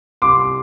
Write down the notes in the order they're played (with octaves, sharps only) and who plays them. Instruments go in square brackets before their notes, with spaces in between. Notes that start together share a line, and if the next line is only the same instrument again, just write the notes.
[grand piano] C2 C6 D6